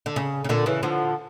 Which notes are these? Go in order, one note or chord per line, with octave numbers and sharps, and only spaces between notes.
D3
C#3
C#3
A#2 D3
C#3 E3
D3 F3